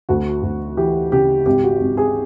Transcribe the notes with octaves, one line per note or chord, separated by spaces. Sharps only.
D2 F#4
D2
E3 G4
C#3 G4
G#1 G4
F#4
G#1
G#4